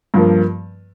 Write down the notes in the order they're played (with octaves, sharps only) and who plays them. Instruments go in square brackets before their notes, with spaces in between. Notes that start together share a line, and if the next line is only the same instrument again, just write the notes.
[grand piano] G2 F3 A#3